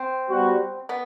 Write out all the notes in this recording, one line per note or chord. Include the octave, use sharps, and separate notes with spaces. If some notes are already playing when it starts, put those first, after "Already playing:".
Already playing: C4
G3 B3 F#4
B3